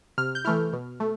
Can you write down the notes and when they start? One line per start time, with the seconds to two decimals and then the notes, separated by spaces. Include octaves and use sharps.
0.18 C3 F6
0.35 G6
0.45 E3 A3 E4 F6
0.73 B2
1.00 A3